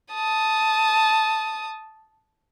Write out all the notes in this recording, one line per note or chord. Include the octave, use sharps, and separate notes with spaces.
A5 D#6